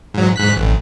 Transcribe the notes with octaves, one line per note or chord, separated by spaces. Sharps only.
G#2 F#3
G#2 F#6 B6
A1